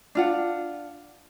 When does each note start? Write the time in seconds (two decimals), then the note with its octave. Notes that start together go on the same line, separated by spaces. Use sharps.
0.15 D4 F4 F#5